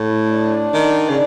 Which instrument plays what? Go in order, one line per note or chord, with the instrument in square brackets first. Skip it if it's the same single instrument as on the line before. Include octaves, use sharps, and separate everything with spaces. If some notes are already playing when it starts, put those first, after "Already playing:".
Already playing: [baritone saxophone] A2
[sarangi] D4
[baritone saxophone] D#3
C#3